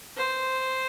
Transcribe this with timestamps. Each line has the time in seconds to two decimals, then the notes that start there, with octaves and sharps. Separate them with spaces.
0.17 C5